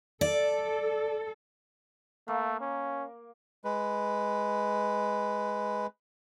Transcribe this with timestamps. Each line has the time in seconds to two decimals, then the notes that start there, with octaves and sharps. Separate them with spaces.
0.21 A4 D5
2.28 A3 A#3
2.61 C#4
3.65 G#3 B4